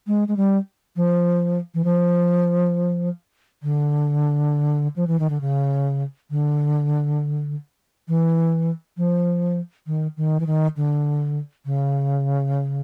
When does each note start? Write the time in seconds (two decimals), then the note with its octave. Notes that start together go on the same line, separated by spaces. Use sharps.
0.07 G#3
0.28 G#3
0.37 G3
0.96 F3
1.74 E3
1.84 F3
3.63 D3
4.96 F3
5.07 E3
5.20 D#3
5.30 D3
5.41 C#3
6.31 D3
8.08 E3
8.97 F3
9.87 D#3
10.17 D#3
10.40 E3
10.47 D#3
10.77 D3
11.65 C#3